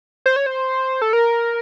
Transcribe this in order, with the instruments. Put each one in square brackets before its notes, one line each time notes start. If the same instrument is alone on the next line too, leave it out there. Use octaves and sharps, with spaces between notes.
[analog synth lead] C5
C#5
C5
A4
A#4